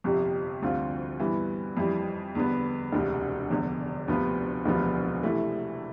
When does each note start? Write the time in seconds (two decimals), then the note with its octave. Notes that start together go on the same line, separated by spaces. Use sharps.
0.04 G1 F2 C3 G3
0.62 D2 D3 G3 C4 F4
1.19 G2 E3 B3
1.77 F2 E3 G3
2.35 E2 D3 G3 B3
2.92 E1 D2 C3
3.50 F1 E2 D3
4.08 D2 C3 F3 B3
4.66 E1 D2 C3 F3 B3
5.23 C3 E3 A3 E4